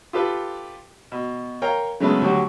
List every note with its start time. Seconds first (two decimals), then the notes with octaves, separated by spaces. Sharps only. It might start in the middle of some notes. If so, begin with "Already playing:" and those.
0.13 F4 G4 A4 B4
1.12 B2
1.62 A#4 C#5 F5 G5 A#5
2.00 C#3 F#3 G#3 A3 B3 B4
2.22 D2 F#3 G3 F#4